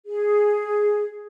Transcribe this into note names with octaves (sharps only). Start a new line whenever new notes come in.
G#4